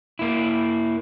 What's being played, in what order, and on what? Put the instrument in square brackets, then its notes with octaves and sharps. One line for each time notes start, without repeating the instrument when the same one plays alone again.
[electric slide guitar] A#3 E4